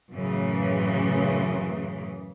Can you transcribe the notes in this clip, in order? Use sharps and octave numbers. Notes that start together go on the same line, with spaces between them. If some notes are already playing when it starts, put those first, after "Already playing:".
F#2 A2 C#3 E3